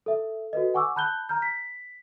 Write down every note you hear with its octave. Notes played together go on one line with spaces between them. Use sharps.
A4 E5
F#4 A4 B4 D#5
F#5 G#5 C#6 D6 E6
A5 B5 F#6 G6 G7
A#5 F6 G6
B6